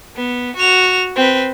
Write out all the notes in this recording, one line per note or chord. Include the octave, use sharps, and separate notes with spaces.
B3
F#4 F7
C4 B4